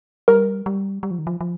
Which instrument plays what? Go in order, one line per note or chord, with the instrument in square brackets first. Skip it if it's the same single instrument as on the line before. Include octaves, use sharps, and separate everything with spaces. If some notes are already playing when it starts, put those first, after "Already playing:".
[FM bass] G3 [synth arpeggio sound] A#4
[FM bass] G3
G3
F3
D#3
F3
F3